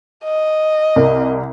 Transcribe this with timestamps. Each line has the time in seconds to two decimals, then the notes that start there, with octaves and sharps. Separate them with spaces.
0.24 D#5
0.96 C2 A#4